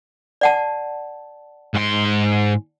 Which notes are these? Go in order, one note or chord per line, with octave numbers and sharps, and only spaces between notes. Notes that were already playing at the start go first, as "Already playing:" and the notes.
D5 F#5 A5
G#2 C6